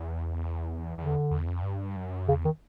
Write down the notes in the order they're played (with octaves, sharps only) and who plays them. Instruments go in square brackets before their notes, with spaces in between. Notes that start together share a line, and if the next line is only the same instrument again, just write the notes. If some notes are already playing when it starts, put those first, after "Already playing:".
Already playing: [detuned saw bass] E2
[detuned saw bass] E2 [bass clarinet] D3
[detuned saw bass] E2
F2
G2
F#2
[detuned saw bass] E2 [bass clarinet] C#3
[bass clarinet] D#3